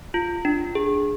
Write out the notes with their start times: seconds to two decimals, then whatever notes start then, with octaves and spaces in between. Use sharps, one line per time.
0.14 F4
0.45 D4
0.75 G#4